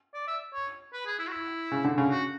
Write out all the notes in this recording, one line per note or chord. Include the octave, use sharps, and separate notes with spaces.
D5
E5
C#5
B4
G#4
E4
F#4
E4
C#3
D3
C#3
F#4